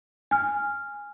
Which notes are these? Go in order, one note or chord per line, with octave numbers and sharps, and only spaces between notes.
G#5 F6